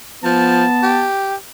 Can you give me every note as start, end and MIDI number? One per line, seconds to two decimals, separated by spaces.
0.24 0.64 53
0.24 1.07 59
0.24 1.06 81
0.83 1.35 67